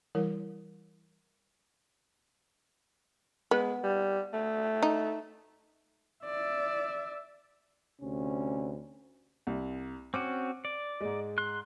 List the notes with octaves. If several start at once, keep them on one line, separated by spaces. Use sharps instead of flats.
E3 G3 E4 A#4 C#5
G#3 B3
G3
A3
D#4
D5 E5
D2 C3 C#4
C2
C4 C#4 F#4 D6
D5
G#2 G#3
C6 F#6